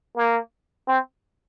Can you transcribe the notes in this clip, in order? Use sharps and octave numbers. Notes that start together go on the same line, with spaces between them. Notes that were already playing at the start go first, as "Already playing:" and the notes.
A#3
C4